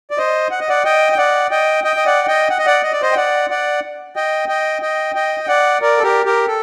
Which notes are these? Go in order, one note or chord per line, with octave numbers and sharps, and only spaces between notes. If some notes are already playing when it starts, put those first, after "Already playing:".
D5
C5 D#5
F#5
D#5
D5 F#5
D#5 G5
G5
D5 F#5
D#5 G5
D#5 G5
D#5
D5 F#5
D#5 G5
F#5
D#5
D5 F#5
D#5
D5
C5 D#5
G5
D5 F#5
D5 F#5
D#5 G5
D#5 G5
D#5 G5
D#5 G5
G5
D5 F#5
A#4 D5
A4
G4 A#4
G4 A#4
A4